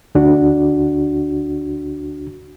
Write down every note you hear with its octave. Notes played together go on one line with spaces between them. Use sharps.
D2 D4 F#4